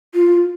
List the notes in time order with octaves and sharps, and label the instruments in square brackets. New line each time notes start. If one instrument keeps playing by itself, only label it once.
[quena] F4